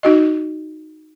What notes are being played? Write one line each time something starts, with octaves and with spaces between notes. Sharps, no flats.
D#4 F#4 D#5